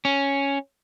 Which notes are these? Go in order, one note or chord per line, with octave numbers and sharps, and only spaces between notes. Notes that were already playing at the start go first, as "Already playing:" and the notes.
C#4